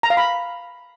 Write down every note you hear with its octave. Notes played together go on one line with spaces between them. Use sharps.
A#5
F5
B5